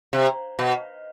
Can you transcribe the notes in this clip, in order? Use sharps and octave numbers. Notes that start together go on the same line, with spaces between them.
C3
B2